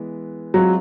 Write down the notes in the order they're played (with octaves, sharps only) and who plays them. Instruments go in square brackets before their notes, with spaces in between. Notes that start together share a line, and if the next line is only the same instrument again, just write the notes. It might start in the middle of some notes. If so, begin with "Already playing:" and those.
Already playing: [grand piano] E3 G#3 B3
[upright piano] F#3 [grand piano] G#3 C4 F4